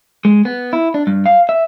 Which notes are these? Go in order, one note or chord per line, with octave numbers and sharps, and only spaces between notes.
G#3
B3
E4
D4
G2
F5
E5